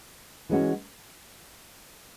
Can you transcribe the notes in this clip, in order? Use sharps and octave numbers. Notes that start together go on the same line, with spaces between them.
E3 G#3 C#4 F#4